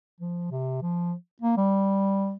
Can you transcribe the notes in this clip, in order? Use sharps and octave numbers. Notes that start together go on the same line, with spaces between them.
F3
C3
F3
A#3
G3